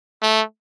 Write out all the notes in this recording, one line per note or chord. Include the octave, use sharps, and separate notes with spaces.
A3